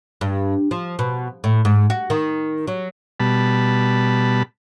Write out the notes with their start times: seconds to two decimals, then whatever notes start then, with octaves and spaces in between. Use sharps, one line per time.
0.21 G2
0.71 F3
0.99 B2
1.44 A2
1.65 G#2
1.90 F#4
2.10 D#3
2.67 F#3
3.20 B2 G3 A5 B5